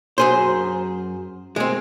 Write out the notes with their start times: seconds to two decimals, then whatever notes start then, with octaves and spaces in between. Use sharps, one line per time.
0.18 F#2 G#4 C5
1.56 G#3 C4